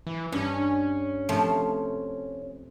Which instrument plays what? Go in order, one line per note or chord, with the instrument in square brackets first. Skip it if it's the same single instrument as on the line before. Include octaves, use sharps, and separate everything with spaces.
[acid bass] E3
[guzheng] G2 [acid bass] C#4
[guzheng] C3 F3 A3